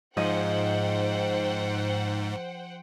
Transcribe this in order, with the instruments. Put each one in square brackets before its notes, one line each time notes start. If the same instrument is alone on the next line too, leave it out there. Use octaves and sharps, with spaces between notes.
[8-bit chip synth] G#2 [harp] F3 G#4 D#5 [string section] C5 F#5 G5